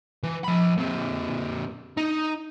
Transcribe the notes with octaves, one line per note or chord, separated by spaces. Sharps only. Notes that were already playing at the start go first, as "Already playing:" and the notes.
E3
F3 B5
A#2 C4
D#4